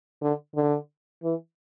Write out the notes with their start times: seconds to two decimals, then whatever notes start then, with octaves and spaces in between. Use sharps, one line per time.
0.22 D3
0.55 D3
1.23 E3